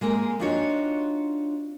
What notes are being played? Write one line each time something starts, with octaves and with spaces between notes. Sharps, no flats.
G#3 A#3 C4 G#4
C4 D4 D#4 F4 F#4 C#5